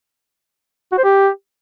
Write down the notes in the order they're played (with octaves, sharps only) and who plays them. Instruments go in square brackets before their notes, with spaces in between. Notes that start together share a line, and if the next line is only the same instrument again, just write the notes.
[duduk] F#4
C5
G4